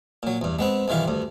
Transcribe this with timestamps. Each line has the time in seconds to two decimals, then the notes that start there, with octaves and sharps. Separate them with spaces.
0.23 A#2 F#3
0.41 E2 G2
0.59 G#3 B3 C4
0.88 B1 G2 D#3 E3 F4
1.08 D2 G2